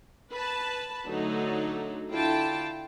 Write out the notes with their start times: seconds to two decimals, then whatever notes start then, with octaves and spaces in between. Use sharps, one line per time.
0.33 B4 A5
1.07 D3 F#3 A3 D#4 F#4 A4
2.11 D3 E4 F4 G5 A5